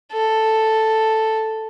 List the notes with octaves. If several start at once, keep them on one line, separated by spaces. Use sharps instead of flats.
A4